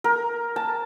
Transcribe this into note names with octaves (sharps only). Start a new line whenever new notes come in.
A#4
A5